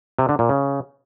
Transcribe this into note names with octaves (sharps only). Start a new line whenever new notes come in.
C3
D3
A#2
C#3